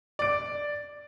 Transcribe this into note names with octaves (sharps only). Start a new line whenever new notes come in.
D5 D7